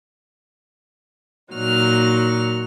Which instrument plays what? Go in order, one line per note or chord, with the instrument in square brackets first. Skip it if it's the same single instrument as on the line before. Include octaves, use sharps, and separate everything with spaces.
[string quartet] A#2 F#3 D#4 F6